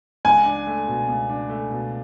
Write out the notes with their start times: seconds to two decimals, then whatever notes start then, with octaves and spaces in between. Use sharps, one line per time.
0.25 C#2 G#5
0.45 D4
0.67 A3
0.88 B2
1.08 C#2
1.30 D4
1.49 A3
1.71 B2